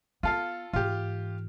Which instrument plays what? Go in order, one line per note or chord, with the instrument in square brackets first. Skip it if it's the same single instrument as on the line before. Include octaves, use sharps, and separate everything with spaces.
[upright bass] B3 [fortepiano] F4 A4 F5
[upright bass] G#2 E3 [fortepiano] F4 G4